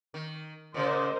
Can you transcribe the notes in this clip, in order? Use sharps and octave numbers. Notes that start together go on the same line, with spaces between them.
D#3
A#2 C#3 A#4 C5 D#5